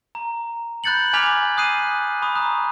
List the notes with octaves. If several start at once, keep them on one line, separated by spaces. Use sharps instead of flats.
A#5
B5 F#6 G6 A6 C#7 F#7
G#5 D6 F6 G#6 B6 F7
D#6 F#6 C7 D#7
B5 C#6 D#6
A#5 D#6 F#6